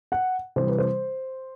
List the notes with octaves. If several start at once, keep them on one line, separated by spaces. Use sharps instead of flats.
F#5
C3 E3 G3 C5
B4
C5